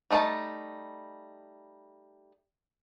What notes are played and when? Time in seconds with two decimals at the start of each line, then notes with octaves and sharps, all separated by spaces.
0.11 G3 A3 D#4 G#4 A5